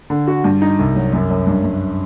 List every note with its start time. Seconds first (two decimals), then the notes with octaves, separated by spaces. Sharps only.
0.10 D3
0.28 F#4
0.44 G2
0.62 D#4
0.79 C2
0.96 F#3
1.13 F#2
1.30 F#2
1.47 G2
1.64 G2